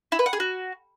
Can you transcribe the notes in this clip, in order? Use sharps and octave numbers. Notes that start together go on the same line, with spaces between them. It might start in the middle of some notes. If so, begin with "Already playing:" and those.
E4
B4
F#5
G#4
F#4